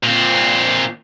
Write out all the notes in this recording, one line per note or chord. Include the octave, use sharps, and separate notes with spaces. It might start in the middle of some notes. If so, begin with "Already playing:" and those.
A#2 C4